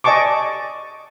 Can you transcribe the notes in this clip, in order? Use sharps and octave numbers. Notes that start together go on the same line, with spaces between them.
D5 D#5 G#5 A5 C#6 D6